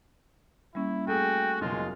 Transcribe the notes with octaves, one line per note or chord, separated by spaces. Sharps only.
G3 A#3 C#4 E4
A3 F#4 G#4 G5
F#1 B2 G#3 F4